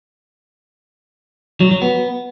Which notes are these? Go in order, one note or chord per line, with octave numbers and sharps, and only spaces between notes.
F#3
F#3
B3